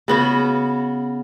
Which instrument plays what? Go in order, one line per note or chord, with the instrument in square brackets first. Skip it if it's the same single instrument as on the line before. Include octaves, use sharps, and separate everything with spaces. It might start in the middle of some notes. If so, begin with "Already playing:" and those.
[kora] C#3 B3 F#4